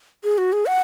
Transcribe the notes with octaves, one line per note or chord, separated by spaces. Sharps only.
G#4
F#4
G#4
F#5